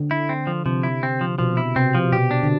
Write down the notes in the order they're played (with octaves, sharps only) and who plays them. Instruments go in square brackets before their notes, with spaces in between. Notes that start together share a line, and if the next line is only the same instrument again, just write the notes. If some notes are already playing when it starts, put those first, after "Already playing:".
Already playing: [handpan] D3
[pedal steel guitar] E4
C4
F3
[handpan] C3 [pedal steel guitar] F3
[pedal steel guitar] E4
C4
F3
[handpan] B2 [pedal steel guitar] F3
[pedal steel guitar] E4
[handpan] C3 [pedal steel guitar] C4
[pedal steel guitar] F3
[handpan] B2 [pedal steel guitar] G4
[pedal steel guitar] D4
[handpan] D3